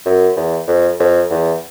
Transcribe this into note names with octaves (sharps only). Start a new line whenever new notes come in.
F#2
E2
F2
F2
E2